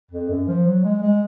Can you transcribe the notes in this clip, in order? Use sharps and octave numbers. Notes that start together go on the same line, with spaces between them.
F2
F#2
F3
F#3
G#3
G#3